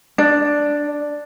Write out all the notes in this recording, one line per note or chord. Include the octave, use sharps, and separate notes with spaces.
D4